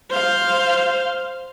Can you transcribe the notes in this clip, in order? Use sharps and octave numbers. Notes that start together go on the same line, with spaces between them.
C5 F5